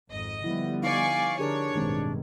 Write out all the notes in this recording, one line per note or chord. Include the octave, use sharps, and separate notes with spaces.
G#1 F2 D#5
D3 F3 G3 B3 E4
D#4 D5 F5 G#5 C#6
D3 D4 G4 G#4 A#4 C#5
A1 G2 B2 D#3 G#3 C4